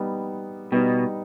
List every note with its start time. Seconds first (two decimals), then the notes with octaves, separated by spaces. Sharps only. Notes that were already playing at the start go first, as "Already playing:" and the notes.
Already playing: G3 B3 D#4
0.72 B2 G3 B3 D#4